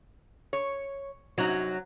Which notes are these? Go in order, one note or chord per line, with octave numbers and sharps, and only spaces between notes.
C#5
F#2 C3 F#3 D#4